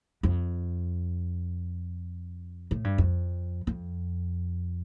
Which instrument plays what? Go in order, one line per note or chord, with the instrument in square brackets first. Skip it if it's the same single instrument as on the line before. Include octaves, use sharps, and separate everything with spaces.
[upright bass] F2
A2
G2
F2
F2